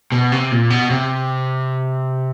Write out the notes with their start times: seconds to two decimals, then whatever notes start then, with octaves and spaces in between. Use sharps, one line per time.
0.12 B2
0.32 C3
0.52 A#2
0.70 B2
0.90 C3